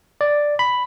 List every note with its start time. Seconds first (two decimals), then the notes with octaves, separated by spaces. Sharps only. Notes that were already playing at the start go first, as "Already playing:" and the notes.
0.21 D5
0.59 B5